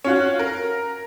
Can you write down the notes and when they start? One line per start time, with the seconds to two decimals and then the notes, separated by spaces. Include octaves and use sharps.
0.05 C#4 F4 F#4
0.39 A#4